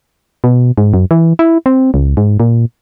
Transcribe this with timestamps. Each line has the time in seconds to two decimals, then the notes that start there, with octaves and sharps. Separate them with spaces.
0.44 B2
0.78 G#2
0.94 F#2
1.11 E3
1.39 E4
1.66 C4
1.94 C#2
2.17 G#2
2.40 A#2